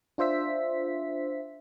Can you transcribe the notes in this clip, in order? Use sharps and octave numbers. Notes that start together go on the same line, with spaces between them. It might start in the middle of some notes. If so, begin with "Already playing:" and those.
D4 F4 C5 E5 B6